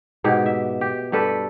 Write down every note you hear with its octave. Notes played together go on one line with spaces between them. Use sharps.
G#2 B2 G4
E5
G4
G2 G4 A4 B4